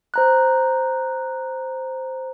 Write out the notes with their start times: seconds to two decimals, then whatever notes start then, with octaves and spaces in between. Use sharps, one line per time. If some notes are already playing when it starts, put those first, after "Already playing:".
0.14 C5 A#5 F#6